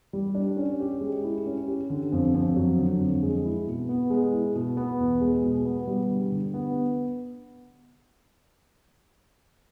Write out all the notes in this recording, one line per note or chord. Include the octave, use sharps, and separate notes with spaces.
G3
D4
C#4
G4
G#3
E4
C#4
G4
D3
F2
F2
F#3
D3
F2
G#3
E4
B2
B3
G#3
E4
B2
B3
E2
G#3
B2
B3
G3
D3
D3
B3